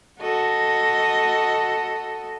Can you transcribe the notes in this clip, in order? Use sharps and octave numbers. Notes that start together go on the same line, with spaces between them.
F#4 A4 D#5